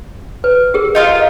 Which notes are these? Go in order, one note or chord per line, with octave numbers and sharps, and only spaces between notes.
B4
G4 G#4 A#4
D#4 F4 F5